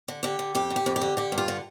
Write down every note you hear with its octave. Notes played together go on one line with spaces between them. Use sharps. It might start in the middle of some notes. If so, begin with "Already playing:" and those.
D3
D3 G4
D3
F2 G4
D3
G4
F2
G4
D3
D3 G4
G2
F4
D3